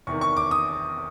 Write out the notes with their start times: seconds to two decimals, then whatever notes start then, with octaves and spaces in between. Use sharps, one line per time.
0.07 E2 C3 D#3 C#6
0.21 C#6
0.37 D6
0.51 D#6